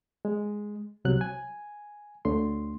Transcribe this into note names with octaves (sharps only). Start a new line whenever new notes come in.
G#3
C2 C3 F#3 F#6
G#5
D2 D3 A3 C6